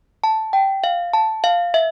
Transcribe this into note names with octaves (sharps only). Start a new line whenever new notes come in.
A5
G5
F5
A5
F5
E5